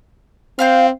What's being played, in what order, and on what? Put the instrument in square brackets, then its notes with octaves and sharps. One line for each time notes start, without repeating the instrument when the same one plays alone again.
[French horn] C4 [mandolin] F4 F5 G6